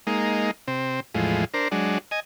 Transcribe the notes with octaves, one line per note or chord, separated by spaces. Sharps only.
G#3 A#3 D#4
C3 C4
E2 A2 F3 G#3
D4 A#4 C5
F#3 G#3 D4
D#5 G#5